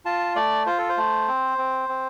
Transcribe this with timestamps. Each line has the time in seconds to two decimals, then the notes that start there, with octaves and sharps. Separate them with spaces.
0.05 F4 A5
0.36 A3 D5
0.66 F4 C5
0.78 A4
0.89 C5
0.97 A3
1.28 C4
1.58 C4
1.89 C4